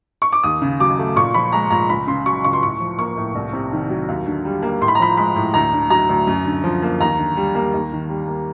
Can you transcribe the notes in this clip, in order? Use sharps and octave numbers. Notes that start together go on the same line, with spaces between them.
C#6
D6
D#2 D#6
C#3
F#3 D6
A3
A#2 C#6
F3 B5
G#3 A#5
A#2 A#5
C#2 B5
C#3 C6
F#3 C#6
C#2 C#6
C6
A2 C#6
F3
A#3 C#6
A2
C2
C3
D#3
F#3
D#2
D3
G3
A#3
A2 C6
B5
A#5
F3 B5
G#3 B5
A2
D2 A#5
D3
F#3 A#5
D2
F#2
D3
F3
A#3
D#2 A#5
D3
G3
A#3
D#2
D#3
G3
A#3